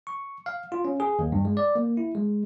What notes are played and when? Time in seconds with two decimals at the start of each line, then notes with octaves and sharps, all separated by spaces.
0.07 C#6
0.46 F5
0.72 F4
0.85 C#4
1.00 G#4
1.19 D#2
1.32 G2
1.45 G#3
1.57 D5
1.75 A#3
1.97 E4
2.15 G#3